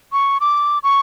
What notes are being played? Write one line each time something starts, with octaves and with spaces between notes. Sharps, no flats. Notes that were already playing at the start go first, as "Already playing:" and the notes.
C#6
D6
C#6